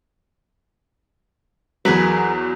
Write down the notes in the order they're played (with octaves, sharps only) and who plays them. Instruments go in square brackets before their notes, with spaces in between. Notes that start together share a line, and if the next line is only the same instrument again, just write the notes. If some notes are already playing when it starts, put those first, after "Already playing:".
[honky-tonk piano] E2 F#3 [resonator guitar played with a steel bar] G#4 A#4 B4